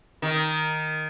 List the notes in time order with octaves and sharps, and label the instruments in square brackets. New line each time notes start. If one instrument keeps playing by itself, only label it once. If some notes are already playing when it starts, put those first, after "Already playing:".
[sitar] D#3